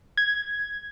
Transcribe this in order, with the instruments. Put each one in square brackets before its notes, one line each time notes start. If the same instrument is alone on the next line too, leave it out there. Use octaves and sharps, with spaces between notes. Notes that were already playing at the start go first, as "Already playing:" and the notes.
[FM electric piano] G#6